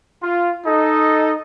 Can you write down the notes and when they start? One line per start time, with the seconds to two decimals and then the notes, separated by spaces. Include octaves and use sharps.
0.23 F4
0.66 D#4 A4 D#5